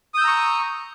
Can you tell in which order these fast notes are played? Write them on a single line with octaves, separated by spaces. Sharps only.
D#6 G6 E6 A#5 C#6